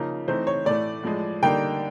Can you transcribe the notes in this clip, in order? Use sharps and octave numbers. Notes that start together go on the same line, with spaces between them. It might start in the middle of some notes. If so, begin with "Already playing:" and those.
Already playing: C#3 F3 A#3 D#4
E3 A3 C4 D#4 C5
C#5
A2 E3 A3 D5
A2 F3 G#3
D3 G3 A#3 D#4 G5